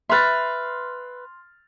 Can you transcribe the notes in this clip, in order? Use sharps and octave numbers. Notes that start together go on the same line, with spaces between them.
B4 E5 C6 F6 A6